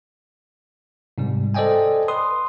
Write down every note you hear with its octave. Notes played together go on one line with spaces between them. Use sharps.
G#2 C3 G3
A4 C5 D5 D#5 G5 G#5
B4 C6 D#6